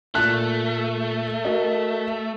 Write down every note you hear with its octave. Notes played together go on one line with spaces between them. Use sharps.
A#2 A3 A5 F#6
F#4 A#4 D#5